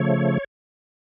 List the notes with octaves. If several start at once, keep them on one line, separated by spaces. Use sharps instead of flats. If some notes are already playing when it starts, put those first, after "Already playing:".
Already playing: C#3 F3 A3 C#5